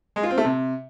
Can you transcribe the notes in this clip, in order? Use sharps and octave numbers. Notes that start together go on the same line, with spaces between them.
G#3
F4
C4
A3
C3